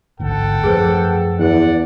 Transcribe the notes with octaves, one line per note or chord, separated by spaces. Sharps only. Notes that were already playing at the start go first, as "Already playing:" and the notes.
A1 D2 G#2 A4 F#5 G5
F#2 F3 A3 G#4 B4 C5
E2 D5 F#5